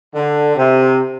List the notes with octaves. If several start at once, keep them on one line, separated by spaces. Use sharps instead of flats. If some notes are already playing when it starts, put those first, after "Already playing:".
D3
C3